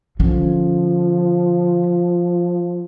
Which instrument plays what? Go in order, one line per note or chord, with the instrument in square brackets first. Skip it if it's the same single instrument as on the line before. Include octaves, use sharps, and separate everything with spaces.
[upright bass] D3 C#4 [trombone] F3